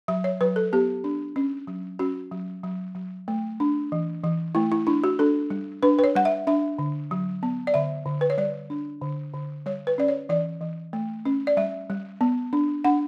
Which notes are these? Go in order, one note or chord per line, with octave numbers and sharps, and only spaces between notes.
F#3 E5
C#5
F#3 B4
A4
B3 G4
D4
C#4
F#3
C#4 F#4
F#3
F#3
F#3
A3
D4
E3
E3
A3 E4
E4
D4 E4
F#4
D4 A4
G3
D4 B4
B4
C#5
G3 F#5
E5
D4 E5
D3
F#3
B3
D5
D3 E5
D3
B4
C#5
G3 D5
D4
D3
D3
G3 C#5
B4
C#4 D5
C#5
E3 D5
E3
A3
C#4
D5
G3 E5
G3
B3
D4
D4 F#5